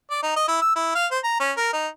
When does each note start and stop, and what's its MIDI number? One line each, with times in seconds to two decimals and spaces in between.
0.11 0.22 74
0.23 0.34 63
0.36 0.45 75
0.48 0.58 64
0.62 0.72 88
0.76 0.90 64
0.95 1.06 77
1.11 1.19 72
1.24 1.37 82
1.40 1.52 61
1.57 1.72 70
1.73 1.87 63